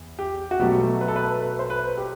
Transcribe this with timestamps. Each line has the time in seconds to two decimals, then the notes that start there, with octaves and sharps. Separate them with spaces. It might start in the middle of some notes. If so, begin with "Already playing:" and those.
Already playing: E2
0.19 G4
0.51 F#4
0.59 B2 F#3 A3 G4
1.01 B4
1.08 A4
1.16 B4
1.42 B4
1.59 C5
1.70 B4
1.98 G4